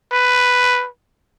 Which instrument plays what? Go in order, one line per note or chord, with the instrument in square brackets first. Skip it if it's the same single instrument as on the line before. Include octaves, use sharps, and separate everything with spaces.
[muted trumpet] B4